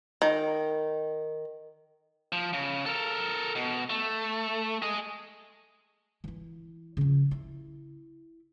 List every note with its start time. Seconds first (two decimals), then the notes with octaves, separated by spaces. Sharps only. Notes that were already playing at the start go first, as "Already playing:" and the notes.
0.22 D#3
2.32 F3
2.53 C#3
2.86 A4 A#4
3.56 B2
3.90 A3
4.82 G#4 D#5
6.24 E3 E4
6.97 C#3 F3
7.31 E4